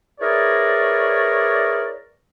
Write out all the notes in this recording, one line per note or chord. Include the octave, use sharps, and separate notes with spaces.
E4 G#4 A#4 B4 C#5 D5